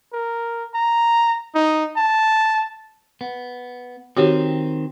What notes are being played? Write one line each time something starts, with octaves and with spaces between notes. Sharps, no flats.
A#4
A#5
D#4
A5
B3
D#3 C4 F#4 G4 C#5